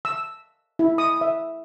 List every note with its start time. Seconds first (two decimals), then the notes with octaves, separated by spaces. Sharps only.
0.05 E6
0.79 E4
0.98 D#6
1.21 E5